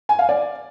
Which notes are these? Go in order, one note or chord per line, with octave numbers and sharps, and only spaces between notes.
G#5
F5
D5